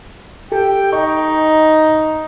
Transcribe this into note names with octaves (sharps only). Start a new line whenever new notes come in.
G4 A4 G5
D#4 D#5 A#5 C#6